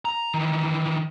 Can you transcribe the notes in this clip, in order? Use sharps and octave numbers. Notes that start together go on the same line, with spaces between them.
A#5
D#3 E3